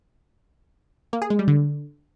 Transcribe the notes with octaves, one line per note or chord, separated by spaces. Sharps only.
A#3
G#4
G#3
G3
D3